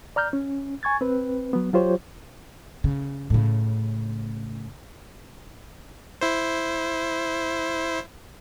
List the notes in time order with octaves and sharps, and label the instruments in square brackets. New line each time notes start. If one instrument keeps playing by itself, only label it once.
[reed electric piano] D5 A#5 F6 G6
C#4
G#5 C#6 G#6 A6
C4 B4
F#3 B3
F#3 F4 G4 C5 C#5
[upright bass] C#3
A2 C#3
[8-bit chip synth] E4 C5